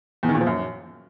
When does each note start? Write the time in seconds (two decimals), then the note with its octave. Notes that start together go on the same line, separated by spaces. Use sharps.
0.23 E2
0.29 D#3
0.35 A#2
0.41 F3
0.47 F#2